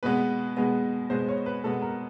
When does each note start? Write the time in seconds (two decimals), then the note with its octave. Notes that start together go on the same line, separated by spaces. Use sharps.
0.03 B2 G#3 B3 B4
0.57 B2 G#3 B3
1.10 B2 G#3 B3 C5
1.29 C#5
1.46 B4
1.64 B2 G#3 B3 A4
1.82 A#4